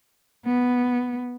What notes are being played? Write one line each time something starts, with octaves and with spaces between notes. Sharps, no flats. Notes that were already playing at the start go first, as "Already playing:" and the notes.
B3